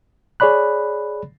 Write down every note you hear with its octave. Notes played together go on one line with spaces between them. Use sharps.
G#4 C#5 D5 B5 F#6